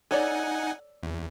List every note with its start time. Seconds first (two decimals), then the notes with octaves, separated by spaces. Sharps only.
0.11 D#4 A4 C#5 D5 F#5 G#5
1.03 E2